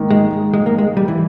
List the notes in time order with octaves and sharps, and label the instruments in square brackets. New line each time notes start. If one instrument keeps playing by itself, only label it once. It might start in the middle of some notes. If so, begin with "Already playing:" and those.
Already playing: [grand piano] G#2 D#3 A#3
[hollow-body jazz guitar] G#3
G#3
A#3
G#3
G3
E3